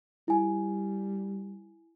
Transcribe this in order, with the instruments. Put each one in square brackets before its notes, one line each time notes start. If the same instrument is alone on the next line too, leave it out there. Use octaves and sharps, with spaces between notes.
[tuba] G3 [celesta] E4 G#5